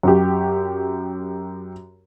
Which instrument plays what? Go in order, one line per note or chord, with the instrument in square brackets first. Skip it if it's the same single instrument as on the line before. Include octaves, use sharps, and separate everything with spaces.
[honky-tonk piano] F#2 G4